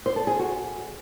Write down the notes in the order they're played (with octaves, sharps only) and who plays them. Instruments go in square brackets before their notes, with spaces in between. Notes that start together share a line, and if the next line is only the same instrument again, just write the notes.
[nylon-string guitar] C5
A4
G#4
F#4